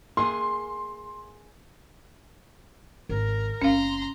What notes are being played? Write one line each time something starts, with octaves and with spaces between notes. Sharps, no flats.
A#3 G#4 C6
G#1 A#4
F#1 C4 C#4 F5 A#5 C6